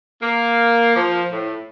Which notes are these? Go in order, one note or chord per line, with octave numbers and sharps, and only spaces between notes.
A#3
F3
A2